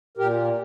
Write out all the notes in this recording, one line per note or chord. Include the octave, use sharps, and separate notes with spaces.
A#2 G4 A#4